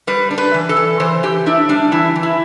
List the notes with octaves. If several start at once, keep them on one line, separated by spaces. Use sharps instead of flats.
G3 B4
D4
B4
E3
A4
E3
E3 C5
E3 G4
D4 E4
G3 D4
E3 E4
E3
E4